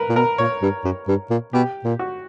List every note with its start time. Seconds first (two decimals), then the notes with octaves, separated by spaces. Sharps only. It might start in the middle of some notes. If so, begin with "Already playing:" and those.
Already playing: A#4 B4
0.09 A#2
0.16 B2 A#4
0.38 A#2 C#5
0.62 G2
0.84 F#2
1.08 G2
1.30 A#2
1.53 B2 G4
1.84 A#2
1.99 F#4